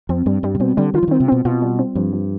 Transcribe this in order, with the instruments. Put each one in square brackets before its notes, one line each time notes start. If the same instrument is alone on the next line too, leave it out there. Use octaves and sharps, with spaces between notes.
[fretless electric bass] F2 [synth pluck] C4
[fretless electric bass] G2 [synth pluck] G3
[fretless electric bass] G2 [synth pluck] G3
[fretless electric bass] C3
[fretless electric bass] B2 [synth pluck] C4
[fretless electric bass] D3 [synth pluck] G3
[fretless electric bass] D#3 [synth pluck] F4
[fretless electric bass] F3
[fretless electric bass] D#3 [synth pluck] C4
[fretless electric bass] C3
[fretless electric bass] B2 [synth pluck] C4
[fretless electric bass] B2 [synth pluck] F4
[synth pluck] G3
C4
[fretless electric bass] G2 [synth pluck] F3
[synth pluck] F3